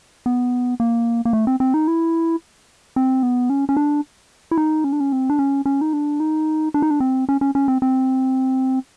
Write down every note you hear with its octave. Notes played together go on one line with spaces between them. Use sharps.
B3
A#3
A#3
A3
C4
C4
D#4
E4
C4
B3
C#4
C#4
D4
E4
D#4
C#4
D4
C#4
C4
D4
C#4
C#4
D#4
D4
D#4
D4
D#4
D4
C4
C#4
C#4
C#4
C4
C4